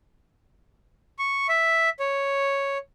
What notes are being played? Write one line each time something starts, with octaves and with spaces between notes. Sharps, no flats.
C#6
E5
C#5